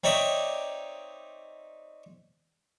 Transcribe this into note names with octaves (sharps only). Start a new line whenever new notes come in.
C4 D#4 C#5 D5 E5